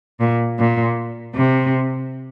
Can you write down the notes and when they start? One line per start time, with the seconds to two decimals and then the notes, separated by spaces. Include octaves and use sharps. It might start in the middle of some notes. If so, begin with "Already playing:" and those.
0.20 A#2
0.59 A#2
1.36 C3